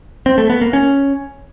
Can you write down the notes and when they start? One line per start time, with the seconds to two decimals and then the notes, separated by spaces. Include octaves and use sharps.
0.26 C4
0.38 A3
0.50 B3
0.61 A#3
0.73 C#4